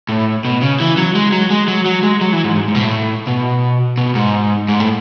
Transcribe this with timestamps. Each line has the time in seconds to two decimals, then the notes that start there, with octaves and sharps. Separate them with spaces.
0.09 A2
0.45 B2
0.62 C#3
0.80 E3
0.97 F#3
1.15 G#3
1.32 F#3
1.50 G#3
1.68 F#3
1.86 F#3
2.03 G#3
2.21 F#3
2.33 E3
2.44 G#2
2.56 G#2
2.68 G#2
2.75 B2
2.80 A2
3.27 B2
3.97 B2
4.15 G#2
4.68 G#2
4.80 A2